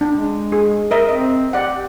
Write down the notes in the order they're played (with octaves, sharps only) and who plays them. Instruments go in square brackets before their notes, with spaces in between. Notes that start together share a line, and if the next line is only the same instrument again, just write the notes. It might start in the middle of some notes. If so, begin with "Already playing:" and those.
[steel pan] D4
[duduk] G#3
[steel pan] G#4
A#4 D#5 E5
[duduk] C4 [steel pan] D#5
[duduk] G4 [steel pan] D5 F#5